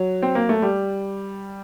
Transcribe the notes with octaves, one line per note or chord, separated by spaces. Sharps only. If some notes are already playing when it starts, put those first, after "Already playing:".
Already playing: F#3
C4
A#3
A3
G3